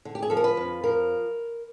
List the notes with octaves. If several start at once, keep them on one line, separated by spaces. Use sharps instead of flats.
D3
G4
G#4
F3 A4
A#4
B4
F2
F3 A#4